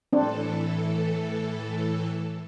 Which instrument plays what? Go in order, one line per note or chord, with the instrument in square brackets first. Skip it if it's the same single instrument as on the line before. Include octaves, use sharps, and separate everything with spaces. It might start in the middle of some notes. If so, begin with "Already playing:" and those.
[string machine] A2 E3 A4 [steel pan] C4 D4